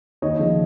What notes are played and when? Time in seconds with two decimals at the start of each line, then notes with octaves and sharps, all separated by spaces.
0.22 D#2 C#5 D#5
0.39 C#3 F3